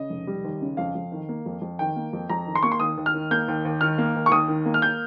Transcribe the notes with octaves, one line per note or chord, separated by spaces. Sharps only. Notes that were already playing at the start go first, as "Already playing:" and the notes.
Already playing: C#3 D#5
F1
G3
D#2
C#3
F2 F5
F2
D#3
A#3
F2
F2
D#3 G5
A#3
F2
F2 A#5
D#3
C6
A#3 C#6
C6
D#2 D#6
D#2
F6
D#3
A#3 G6
D#2
D#2
D#3 F6
A#3
D#2
C#6
D#2 D#6
D#3
A#3
F6
G6